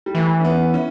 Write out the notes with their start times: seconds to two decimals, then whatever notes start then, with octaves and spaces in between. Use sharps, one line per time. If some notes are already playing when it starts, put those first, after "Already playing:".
0.06 G3
0.15 E3 A3
0.40 C#4
0.44 B3
0.74 C#4